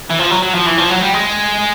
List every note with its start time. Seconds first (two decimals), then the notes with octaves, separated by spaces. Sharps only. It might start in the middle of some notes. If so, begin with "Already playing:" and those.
0.10 E3
0.19 F3
0.30 F#3
0.42 F#3
0.55 F3
0.66 E3
0.78 F3
0.90 F#3
1.02 G3
1.14 G#3